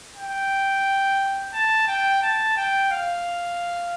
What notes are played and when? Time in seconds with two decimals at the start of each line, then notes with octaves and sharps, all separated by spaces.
0.16 G5
1.53 A5
1.88 G5
2.22 A5
2.57 G5
2.91 F5